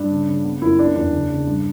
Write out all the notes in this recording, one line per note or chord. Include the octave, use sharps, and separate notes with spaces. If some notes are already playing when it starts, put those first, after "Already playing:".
Already playing: G2 D4
C#3
C#3
B3
F#2 E4
B3 D4
E2 D4
C#3
C#3
G2